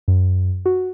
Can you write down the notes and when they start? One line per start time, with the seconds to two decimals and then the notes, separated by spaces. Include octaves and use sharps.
0.08 F#2
0.66 F#4